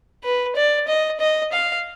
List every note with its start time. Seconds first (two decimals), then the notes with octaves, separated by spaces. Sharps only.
0.24 B4
0.56 D5
0.88 D#5
1.20 D#5
1.52 F5